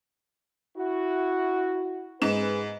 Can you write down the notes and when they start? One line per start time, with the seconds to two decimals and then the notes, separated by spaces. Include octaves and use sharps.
0.77 E4 F#4
2.22 G#2 G#4 B4 E7